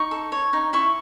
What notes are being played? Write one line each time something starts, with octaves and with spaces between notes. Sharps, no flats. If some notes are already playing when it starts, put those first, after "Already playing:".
Already playing: D#4 C#6
A4
C#5
D#4
E4 C#6